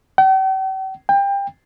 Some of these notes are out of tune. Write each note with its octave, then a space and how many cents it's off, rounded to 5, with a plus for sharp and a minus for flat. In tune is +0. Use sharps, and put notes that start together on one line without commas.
G5 -45
G5 +25